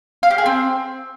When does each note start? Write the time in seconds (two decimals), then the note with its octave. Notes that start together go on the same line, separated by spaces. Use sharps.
0.23 F5
0.31 G4
0.38 G#4
0.46 C4